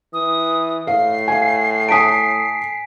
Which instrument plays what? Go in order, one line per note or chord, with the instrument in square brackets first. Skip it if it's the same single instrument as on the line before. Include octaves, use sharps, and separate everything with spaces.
[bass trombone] E3 [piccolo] D#6
[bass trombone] A2 [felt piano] F5 [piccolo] C7
[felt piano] F5 G#5
[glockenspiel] G#5 B6 D7 [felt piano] A5 D#6